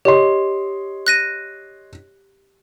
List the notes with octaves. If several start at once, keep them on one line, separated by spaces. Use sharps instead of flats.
G4 C#5 D#5 C6
F#6 A#6 D#7